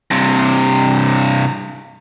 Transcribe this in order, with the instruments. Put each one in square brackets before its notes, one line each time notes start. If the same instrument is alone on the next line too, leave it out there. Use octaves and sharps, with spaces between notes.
[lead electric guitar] G2 C3